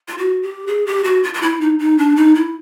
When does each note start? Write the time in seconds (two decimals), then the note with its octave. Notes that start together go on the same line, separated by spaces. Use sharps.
0.08 F4
0.18 F#4
0.43 G4
0.67 G#4
0.86 G4
1.04 F#4
1.23 F4
1.34 F4
1.42 E4
1.61 D#4
1.79 D#4
1.98 D4
2.16 D#4
2.35 E4